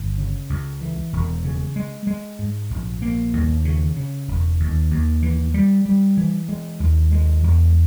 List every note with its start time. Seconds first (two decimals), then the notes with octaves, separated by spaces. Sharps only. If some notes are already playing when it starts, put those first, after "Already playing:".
Already playing: G1
0.18 C#3
0.50 C#2
0.81 E3
1.13 E1
1.44 C#3
1.76 G#3
2.07 G#3
2.39 G#2
2.70 A#1
3.02 A#3
3.33 D#2
3.65 C#3
3.96 C#3
4.28 E1
4.60 D#2
4.91 D#2
5.22 E3
5.54 G3
5.85 G3
6.17 E3
6.49 G#3
6.80 D#2
7.12 G#3
7.43 E2